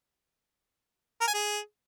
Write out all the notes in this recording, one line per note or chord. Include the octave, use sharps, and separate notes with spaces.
A#4
G#5
G#4